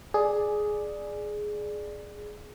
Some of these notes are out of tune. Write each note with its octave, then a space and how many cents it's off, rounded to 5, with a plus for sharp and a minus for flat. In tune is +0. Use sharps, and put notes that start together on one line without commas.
G#4 +10 D5 +10